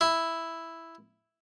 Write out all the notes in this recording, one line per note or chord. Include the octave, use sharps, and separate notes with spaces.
E4